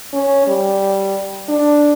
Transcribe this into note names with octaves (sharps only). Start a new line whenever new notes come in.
C#4
G3
D4